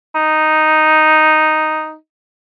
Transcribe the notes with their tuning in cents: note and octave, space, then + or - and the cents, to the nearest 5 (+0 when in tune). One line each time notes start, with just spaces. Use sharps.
D#4 +0